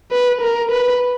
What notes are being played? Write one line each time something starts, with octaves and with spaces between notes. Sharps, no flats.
B4
A#4
B4